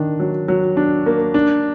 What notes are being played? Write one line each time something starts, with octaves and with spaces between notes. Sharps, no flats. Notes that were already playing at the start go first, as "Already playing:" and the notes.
Already playing: D#3 D4
F#3
F#3
D4
A#3
D4